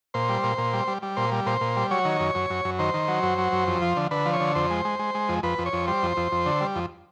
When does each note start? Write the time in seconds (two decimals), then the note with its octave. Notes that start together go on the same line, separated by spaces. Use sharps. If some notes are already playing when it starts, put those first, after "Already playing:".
0.14 A#2 C5
0.29 G3
0.44 A#2
0.58 A#2
0.73 G3
0.88 G3
1.02 G3
1.17 A#2 C5
1.32 G3
1.46 A#2 C5
1.61 A#2
1.76 G3
1.91 F#3 C#5
2.05 D#3
2.20 F#2
2.35 F#2
2.50 F#2
2.65 F#2
2.79 D#3 C5
2.94 D#3
3.08 F#3
3.23 F#2
3.38 F#3
3.52 F#2
3.67 F2
3.82 F3
3.97 D3
4.11 D3 B4
4.26 F3
4.33 C#5
4.40 D3
4.55 F2 C5
4.70 G#3
4.85 G#3
4.99 G#3
5.15 G#3
5.29 F2
5.43 F2 B4
5.58 F2
5.66 C#5
5.73 F2
5.87 G3 C5
6.03 F2
6.17 F2
6.32 F2
6.46 D3
6.61 G3
6.76 F2